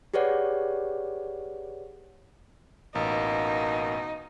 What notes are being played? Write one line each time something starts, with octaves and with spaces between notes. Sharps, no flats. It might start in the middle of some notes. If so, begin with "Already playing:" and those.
G4 G#4 B4 C#5 D5 F#5
A1 B2 A#3 D#4